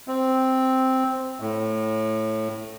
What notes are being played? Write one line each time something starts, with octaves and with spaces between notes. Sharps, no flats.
C4
A2